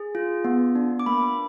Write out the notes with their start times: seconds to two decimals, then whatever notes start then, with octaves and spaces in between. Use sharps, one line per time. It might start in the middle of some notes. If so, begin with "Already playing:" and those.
Already playing: G#4
0.15 F4
0.44 B3
0.75 D4
0.99 D6
1.06 A#3 B5